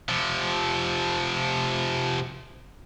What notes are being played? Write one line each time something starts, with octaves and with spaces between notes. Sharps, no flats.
C3 F3